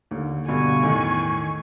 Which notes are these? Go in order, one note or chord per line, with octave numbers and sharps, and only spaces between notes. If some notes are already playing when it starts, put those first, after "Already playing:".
D#2 D3
G2 B2 D3 G#5 C#6
E2 A2 D#3